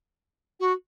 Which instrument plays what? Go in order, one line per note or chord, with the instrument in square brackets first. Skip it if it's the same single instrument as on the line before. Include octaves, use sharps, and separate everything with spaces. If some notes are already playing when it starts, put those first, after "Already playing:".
[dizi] F#4